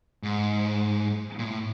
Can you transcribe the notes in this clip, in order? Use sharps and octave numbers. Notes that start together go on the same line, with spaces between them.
G#2
A#2
A2